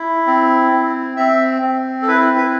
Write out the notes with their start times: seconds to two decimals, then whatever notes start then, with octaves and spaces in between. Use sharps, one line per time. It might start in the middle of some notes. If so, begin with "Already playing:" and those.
Already playing: E4
0.26 C4
0.72 C4
1.16 C4 E5
1.62 C4
2.02 A4
2.08 E4 B4
2.37 B4